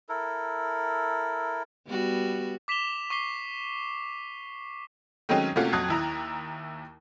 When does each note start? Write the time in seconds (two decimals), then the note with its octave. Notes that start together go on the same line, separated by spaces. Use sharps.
0.09 E4 A4 A#4
1.87 G3 B3 F#4
2.68 D6 B6 E7 F7 G7
3.10 C#6 D6 B6 C7 G7
5.29 D#3 F#3 G#3 A3 C4 C#4
5.56 C3 A3 A#3 C#4 F4 F#4
5.73 F2 F#3 F#4 D#6 F#6 G#6
5.89 D#2 E4 A#5